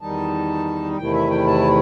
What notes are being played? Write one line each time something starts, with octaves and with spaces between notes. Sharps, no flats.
E2 D#3 G3 D#4 A5
E2 C3 D#3 A3 E4 G5
E5
G5
A5